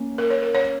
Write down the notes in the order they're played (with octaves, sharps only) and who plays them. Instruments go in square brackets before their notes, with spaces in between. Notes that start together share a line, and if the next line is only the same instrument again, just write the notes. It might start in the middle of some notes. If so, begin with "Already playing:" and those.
Already playing: [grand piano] A#3 C#4
[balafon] A#4
C#5
A#4
C#5